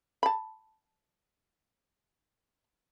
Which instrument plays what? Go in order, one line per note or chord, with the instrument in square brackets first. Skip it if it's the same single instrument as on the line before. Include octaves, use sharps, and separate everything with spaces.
[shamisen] A5 B5